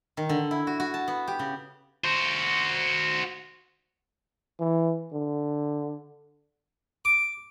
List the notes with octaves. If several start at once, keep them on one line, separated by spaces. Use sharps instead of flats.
D#3
D3
E4
F#4
F#4
A5
B3
G4
C#3
F#4 C5
E3
D3
D6